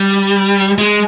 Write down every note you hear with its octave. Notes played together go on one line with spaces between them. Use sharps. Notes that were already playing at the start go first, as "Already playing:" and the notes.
Already playing: G3
G#3